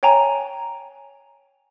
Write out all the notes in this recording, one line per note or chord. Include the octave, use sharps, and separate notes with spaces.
C#5 G5 G#5 A#5